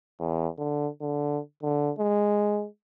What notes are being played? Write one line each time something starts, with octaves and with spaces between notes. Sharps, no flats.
E2
D3
D3
D3
G#3